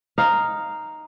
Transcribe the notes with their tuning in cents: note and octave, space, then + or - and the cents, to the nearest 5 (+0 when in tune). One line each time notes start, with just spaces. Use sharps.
D#4 +0 F5 +0